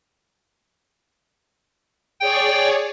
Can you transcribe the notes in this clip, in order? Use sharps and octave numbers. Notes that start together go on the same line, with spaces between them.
G#4 C#5 D5 G5